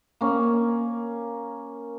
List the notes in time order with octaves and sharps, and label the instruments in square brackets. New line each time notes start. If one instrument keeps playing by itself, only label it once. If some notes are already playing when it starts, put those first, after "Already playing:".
[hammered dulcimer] A#3 C#4